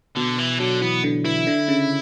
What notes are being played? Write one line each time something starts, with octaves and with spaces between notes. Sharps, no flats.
B2 D3
E3
D3 F#3
E3 B3
D3
E3 E4
D3
C#3